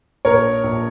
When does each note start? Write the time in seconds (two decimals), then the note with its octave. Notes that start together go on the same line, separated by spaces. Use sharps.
0.25 A#1 A#4 C#5
0.64 A#1